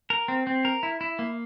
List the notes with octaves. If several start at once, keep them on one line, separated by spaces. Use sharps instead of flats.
A#4
C4
C4
A#4
E4
E4
A#3